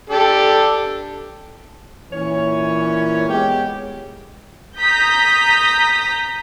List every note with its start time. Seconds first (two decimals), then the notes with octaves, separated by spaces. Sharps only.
0.10 D4 G4 A4
2.12 A#2 E3 C#4 C#5
3.28 G#3 B3 G4
4.78 A#5 D#6 G6 B6